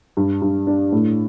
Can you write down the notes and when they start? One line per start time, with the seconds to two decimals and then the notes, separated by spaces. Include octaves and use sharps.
0.17 G2
0.42 G2
0.67 D4
0.92 A2